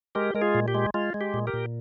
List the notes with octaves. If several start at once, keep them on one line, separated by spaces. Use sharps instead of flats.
G#3 G4 A#4
G#3 A#4
F4 G#4
A#2
G4
G#3
G#3 F4
G#3
G4
A#2
G4 A#4
A#2